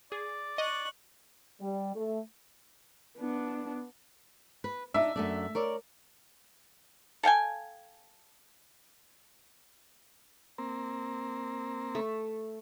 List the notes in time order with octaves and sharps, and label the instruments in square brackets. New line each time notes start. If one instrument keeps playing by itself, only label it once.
[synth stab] G#4 [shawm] D5
[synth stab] D#5 [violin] C#6 F#6
[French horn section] G3
A3
[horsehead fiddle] B3 D4
[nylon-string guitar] B4
[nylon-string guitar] D4 D#4 [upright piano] E5
[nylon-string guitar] F#2 A3 D4
A#4 C#5 D5
[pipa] A4 F5 G5 G#5
[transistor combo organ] A#3 C4
[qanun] A3